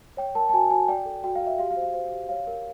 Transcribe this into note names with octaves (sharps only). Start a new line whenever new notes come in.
C#5 G5
A#4 A5
A5
F#4 G#5
F#4 G#5
D5 G5
A4
F#4 G5
F5
F#4
E5
G4 F5
F5
C5
F5
C5
G4
C#5 F5
A#4